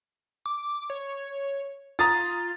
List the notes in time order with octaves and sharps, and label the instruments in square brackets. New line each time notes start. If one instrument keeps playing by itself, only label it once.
[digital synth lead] D6
C#5
[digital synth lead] F4 [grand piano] A#5 D#6 A6